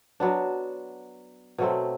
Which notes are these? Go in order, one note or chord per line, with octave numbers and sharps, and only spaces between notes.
F#3 B3 D4
B2 F#3 A3 C4